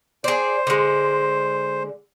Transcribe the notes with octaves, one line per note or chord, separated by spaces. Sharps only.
G#4 C5 D5
D3 G#3